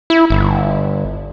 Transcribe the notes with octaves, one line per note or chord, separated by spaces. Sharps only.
E4
G1